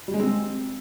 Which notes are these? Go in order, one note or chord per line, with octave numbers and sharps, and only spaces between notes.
G3
G#3
C4